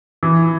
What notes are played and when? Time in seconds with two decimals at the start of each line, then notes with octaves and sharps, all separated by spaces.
0.23 E3